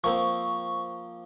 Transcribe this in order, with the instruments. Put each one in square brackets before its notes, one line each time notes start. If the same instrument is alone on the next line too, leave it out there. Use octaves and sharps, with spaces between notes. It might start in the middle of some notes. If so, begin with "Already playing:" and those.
[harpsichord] F3 A#3 C4 [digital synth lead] C#6